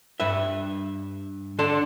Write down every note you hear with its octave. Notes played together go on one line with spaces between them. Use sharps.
G2 B4 E5
D3 D4 A4 D5 A5 C6